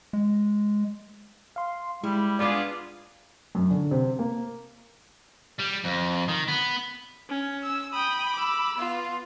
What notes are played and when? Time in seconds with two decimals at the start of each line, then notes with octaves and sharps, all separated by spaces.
0.13 G#3
1.56 F5 C6
2.04 G3 G#3 E4
2.39 B3 D4 F4 G#4 D5
3.55 F#2
3.71 D3
3.91 C3
4.19 A#3
5.59 G3
5.84 F2
6.28 D#3
6.48 B3
7.29 C#4
7.63 E6
7.94 G5 B5 D#6
8.34 D6 E6
8.78 B3 F4